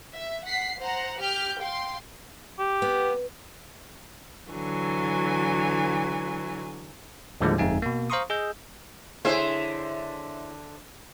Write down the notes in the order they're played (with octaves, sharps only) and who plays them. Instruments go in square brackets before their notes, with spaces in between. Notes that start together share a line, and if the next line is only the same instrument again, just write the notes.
[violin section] E5
F#5 B6 C7
C5 F#5 A#5
G4 F6 G6
F5 G5 C6
[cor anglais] G4
[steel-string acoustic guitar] B3
[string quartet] D3 E3 F#3 G#5
[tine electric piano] D#2 A2 D3 F3 G3 G#3
G1 F2 G#3 D#4 E5 G#5
B2 A#3
C5 F5 A#5 C6 C#6 D#6
G#4 D#5 E6 G6
[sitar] D3 C5 E5 [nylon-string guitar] E4 G#4 C#5